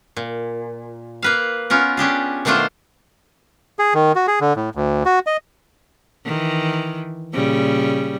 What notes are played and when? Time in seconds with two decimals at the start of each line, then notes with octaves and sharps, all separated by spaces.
0.17 A#2
1.22 A#3 B4 F5
1.70 B3 C#4 F4 A#4
1.97 C#4 D4 G4 G#4
2.45 B2 D#3 A3 D4 F4 C5
3.79 G#4
3.94 D#3
4.16 F#4
4.27 G#4
4.41 D3
4.56 A2
4.75 D2
5.05 F#4
5.27 D#5
6.25 D#3 E3
7.33 A#2 C#3 G3